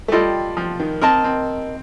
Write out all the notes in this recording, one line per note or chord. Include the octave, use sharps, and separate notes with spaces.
A3
G3 F4 A4 D#5 G5
F3
D#3
C4 A#4 D#5 A5
C4